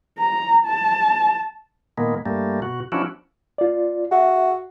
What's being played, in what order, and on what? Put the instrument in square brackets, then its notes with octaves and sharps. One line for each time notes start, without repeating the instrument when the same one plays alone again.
[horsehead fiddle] A#5
A5
[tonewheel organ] A#2 D#3 G#3 A#3 B3
G2 G3 A3 A#3
B2 F#4
F3 C#4 D4 E4 F#4
[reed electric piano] F4 D5
[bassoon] F#4 [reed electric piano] G#4 E5 F#5